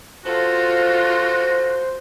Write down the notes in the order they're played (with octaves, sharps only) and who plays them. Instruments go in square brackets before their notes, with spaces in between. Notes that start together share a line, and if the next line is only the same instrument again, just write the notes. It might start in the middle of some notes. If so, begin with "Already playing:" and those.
[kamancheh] F4 A4 [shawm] F#4 [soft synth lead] C5